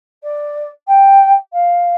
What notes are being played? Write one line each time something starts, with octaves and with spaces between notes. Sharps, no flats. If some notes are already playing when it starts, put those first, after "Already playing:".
D5
G5
F5